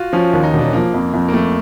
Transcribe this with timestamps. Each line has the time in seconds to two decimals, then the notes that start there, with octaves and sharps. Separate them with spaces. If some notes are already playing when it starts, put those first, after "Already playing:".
Already playing: F4 F#4
0.13 F3 C#4
0.33 D#2
0.43 D#4
0.53 E1
0.59 D4
0.73 F3 A#3
0.94 F2
1.14 F2
1.28 A#3
1.34 F2 A3